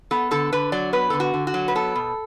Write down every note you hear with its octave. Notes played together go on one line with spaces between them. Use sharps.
B3 A4
D3 A4
D3 B4
F#3 D5
B3 B4
D3 A4
F#4
D3
F#4
F#3
B4
B3 A4
B2